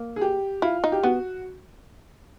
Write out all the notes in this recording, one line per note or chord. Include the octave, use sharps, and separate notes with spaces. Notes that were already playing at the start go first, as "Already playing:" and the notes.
Already playing: A#3
G#4
G4
E4 F4
D#4
G4
B3 F#4